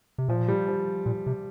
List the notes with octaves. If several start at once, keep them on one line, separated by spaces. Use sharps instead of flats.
C3
A#2 F3
G3
F3
A#2
C3